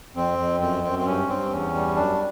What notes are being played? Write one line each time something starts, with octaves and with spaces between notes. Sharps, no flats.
F2 C4
F2
F#2 C4
F#2 C4
C4
G2 C#4
G2 C4
E2 C#4
G3
F#2 D4